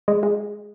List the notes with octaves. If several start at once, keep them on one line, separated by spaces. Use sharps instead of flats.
G#3
G#3